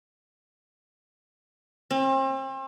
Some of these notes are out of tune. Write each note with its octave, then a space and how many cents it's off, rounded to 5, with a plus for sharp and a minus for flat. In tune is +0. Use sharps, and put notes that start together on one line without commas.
C4 +40